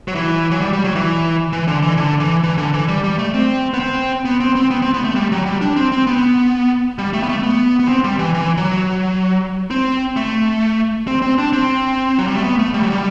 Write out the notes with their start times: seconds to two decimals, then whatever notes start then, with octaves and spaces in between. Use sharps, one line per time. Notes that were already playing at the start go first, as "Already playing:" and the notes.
0.08 F#3
0.15 E3
0.51 F#3
0.61 G3
0.73 G3
0.84 F#3
0.95 E3
1.53 E3
1.68 D3
1.82 E3
1.97 D3
2.20 E3
2.43 E3
2.58 D3
2.74 E3
2.88 G3
3.04 G3
3.19 A3
3.34 C4
3.74 B3
3.80 C4
4.25 B3
4.40 C4
4.55 C4
4.71 B3
4.82 C4
4.94 B3
5.04 A3
5.16 G3
5.32 F#3
5.46 G3
5.61 D4
5.76 C4
5.92 C4
6.07 B3
6.98 G3
7.13 A3
7.23 B3
7.29 A3
7.43 B3
7.80 B3
7.88 C4
8.04 G3
8.19 E3
8.34 E3
8.57 F#3
9.71 C4
10.17 A3
11.07 C4
11.22 C4
11.38 D4
11.53 C4
12.19 F#3
12.27 G3
12.35 A3
12.44 B3
12.59 A3
12.74 G3
12.83 F#3
12.90 G3